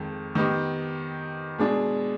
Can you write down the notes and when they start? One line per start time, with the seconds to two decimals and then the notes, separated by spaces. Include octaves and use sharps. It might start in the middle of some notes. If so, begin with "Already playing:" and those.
Already playing: F2 D#3 G#3
0.35 D#3 B3 D#4 G4
1.58 B2 G#3 D4 G#4